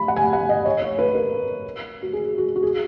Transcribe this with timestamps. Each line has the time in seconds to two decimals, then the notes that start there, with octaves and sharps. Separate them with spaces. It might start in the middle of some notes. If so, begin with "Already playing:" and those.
Already playing: B5
0.08 F#5
0.16 G#5
0.33 F#5
0.49 D#5
0.66 C#5
0.82 C#5
0.99 B4
1.15 A#4
2.02 F#4
2.13 G#4
2.38 F#4
2.56 F#4
2.63 G#4